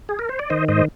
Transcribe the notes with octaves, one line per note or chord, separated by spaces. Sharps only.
G#4
A#4
C5
D5
D#3 C5 D#5
G#2 C5 D#5